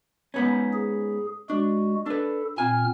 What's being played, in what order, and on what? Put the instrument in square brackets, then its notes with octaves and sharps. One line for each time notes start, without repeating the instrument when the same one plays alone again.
[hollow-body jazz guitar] G#2 B3 C#4
[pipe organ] G#4
[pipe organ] G#3 F#4 [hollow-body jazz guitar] D4
[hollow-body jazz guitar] D4 B4 [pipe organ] A4
[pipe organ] A#2 C4 F6 [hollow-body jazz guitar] F5 G#5